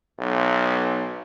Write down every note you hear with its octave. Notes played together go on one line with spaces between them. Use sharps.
B1